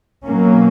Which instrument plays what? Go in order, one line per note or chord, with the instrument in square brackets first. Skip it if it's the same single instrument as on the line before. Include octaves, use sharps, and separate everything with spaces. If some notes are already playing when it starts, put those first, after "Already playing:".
[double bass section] B2 F#3 A#3 C#4